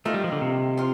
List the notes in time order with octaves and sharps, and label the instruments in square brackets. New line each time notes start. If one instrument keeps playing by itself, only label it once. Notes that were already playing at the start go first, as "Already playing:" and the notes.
[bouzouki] D#3 A#3 F4 [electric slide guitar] A3
[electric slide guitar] G3
F3
D3
C3
[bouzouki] F3 F4